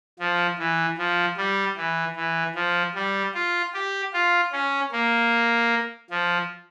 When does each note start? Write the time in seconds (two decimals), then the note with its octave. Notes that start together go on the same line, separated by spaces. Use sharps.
0.19 F3
0.58 E3
0.98 F3
1.37 G3
1.77 E3
2.16 E3
2.55 F3
2.95 G3
3.34 F4
3.74 G4
4.13 F4
4.53 C#4
4.92 A#3
6.10 F3